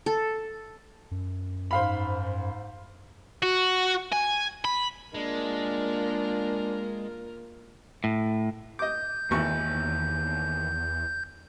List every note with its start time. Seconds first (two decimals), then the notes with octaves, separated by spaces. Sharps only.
0.06 A4
1.11 F#2
1.71 G#2 C5 F5 B5
3.43 F#4
4.12 G#5
4.65 B5
5.14 G#3 A#3 D4 F4 A#4
8.04 A2
8.79 D#5 D6 G6
9.31 G#1 E2 D#3 E3 A#3 C#6